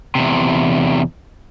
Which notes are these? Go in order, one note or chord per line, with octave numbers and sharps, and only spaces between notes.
E2 C3